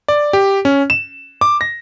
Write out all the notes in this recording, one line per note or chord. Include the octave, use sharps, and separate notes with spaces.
D5
G4
C#4
E7
D6
A#6